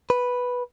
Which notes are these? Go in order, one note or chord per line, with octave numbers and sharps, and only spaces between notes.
B4